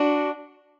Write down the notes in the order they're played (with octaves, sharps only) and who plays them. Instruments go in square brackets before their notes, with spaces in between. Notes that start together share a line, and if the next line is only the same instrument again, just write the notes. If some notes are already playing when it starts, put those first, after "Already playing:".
Already playing: [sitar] D4 F#4